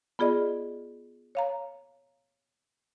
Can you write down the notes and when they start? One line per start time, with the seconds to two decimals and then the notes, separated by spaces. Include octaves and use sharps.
0.19 B3 F4 G#4 D5 D#5
1.35 C#5 F5 A#5